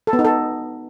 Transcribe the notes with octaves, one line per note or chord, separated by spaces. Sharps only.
A4
B3
D#4
A4